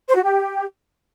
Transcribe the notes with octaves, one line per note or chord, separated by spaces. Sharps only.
C5
F#4
G4